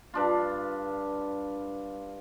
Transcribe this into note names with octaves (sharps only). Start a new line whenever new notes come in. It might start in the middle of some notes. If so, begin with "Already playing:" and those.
G2 D4 F4